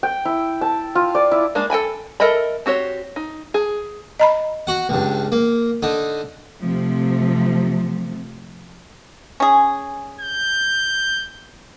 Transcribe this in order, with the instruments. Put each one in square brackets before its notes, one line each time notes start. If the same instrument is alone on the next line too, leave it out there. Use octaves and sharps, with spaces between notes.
[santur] G5
E4
A5
F4
D5
E4
[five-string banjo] G#3 A#3 D4
A4 G5 G#5 B5
A4 A#4 D#5 E5 B5
C4 F#4 G4 C#5
D#4
G#4
[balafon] D#5 A#5 B5
[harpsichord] F#4 F#5
C#2 G2
A#3
D3 D#4
[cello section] C3 F3 A3
[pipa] C#4 G#4
[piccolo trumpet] G6